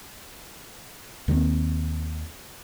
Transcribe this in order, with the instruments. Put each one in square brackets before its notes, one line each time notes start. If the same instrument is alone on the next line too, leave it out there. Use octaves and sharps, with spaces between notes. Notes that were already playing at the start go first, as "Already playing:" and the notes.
[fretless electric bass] D#2 D#3 G#3 C4